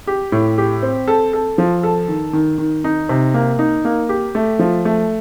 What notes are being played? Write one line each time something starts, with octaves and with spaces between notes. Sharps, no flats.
G4
A2
G4
C4
A4
A4
F3
A4
D#3
D#3
D#3
D#4
C3
A#3
D#4
A#3
G4
A3
F3
A3